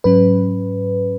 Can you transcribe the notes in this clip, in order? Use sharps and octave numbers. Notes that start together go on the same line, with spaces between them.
G#2 F#3 C#4 B4